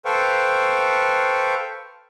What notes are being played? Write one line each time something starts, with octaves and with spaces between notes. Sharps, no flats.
A4 B4 C5 F5 G5 C#6